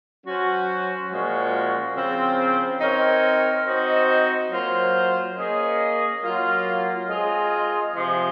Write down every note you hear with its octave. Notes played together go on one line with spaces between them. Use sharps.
F#3 C#4 F#4 C5
A#2 F3 G#3 C#4 F#4
C#3 F3 C4
C4 D#4 A#4 C#5
C4 D#4 F#4 C5 D#5
F#3 A#3 F4 C5
A#3 C#4 G#4 D#5
F#3 A#3 F4
G#3 C4 F4 G#4 D#5
C3 F3 G#3